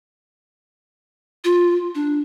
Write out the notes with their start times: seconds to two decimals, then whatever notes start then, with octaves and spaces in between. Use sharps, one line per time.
1.44 F4
1.95 D4